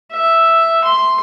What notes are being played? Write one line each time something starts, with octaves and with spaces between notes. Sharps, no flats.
E5
C6